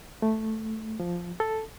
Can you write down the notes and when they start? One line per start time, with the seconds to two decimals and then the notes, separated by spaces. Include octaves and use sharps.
0.22 A3
1.00 F3
1.40 A4